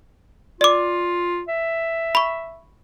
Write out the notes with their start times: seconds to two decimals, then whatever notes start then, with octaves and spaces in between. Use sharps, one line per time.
0.61 F4 D5 D6
1.48 E5
2.15 B5 C#6